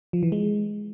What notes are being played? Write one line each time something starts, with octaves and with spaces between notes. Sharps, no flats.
F3
E3
G#3